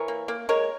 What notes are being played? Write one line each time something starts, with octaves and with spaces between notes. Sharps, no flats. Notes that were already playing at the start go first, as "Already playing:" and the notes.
Already playing: E3 A#4 C#5
A#3
A#3
G#3 A#4 C#5